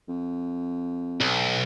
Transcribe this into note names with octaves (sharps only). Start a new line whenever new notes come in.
F2
B1